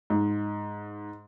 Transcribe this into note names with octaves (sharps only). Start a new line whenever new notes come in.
G#2